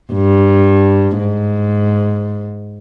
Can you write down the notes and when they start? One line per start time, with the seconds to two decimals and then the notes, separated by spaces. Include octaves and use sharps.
0.13 G2
1.18 G#2